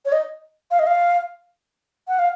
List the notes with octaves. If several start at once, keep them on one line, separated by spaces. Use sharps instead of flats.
C#5
D#5
F5
D#5
F5
F#5
F5